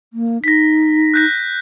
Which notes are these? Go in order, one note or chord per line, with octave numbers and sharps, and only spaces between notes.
A#3
D#4 A#6 B6
F#6 G6 A#6